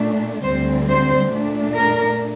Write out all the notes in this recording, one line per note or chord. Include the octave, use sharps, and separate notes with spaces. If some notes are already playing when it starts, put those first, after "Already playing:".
Already playing: A#2 A3 D4
D2 D3 G3 C4 C5
C5
A#2 A3 D4
A#4